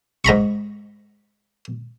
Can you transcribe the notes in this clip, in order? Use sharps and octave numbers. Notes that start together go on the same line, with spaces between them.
G#2 A#5 B5 C#6